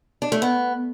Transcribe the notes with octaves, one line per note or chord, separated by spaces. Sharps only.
D4
A3
B3